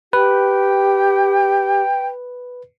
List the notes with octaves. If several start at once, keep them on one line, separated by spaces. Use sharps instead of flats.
G4 B4 G5